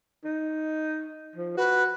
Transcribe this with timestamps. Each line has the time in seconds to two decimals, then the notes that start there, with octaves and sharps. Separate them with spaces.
0.24 D#4
1.36 F3
1.57 F#4 B4